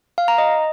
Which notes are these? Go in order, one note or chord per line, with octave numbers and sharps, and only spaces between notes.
F5
A#5
D#5